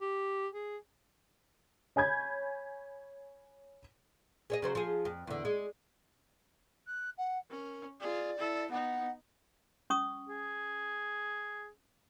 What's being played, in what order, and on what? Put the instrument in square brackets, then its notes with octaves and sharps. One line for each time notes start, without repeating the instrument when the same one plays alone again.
[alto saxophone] G4
G#4
[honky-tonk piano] C#5 G#5 B5 G6 G#6
[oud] G#4 C#5 D#5
C#3 F#3 C5
F3 G#4
F2
E2 D3
G#3
[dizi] F#6
F#5
[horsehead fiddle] C#4 [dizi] A#4
[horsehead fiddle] F4 G#4 [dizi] D5
[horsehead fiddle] E4 A4
[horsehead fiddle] B3 D#4 [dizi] F#5
[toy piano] C#4 C#6 D#6
[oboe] G#4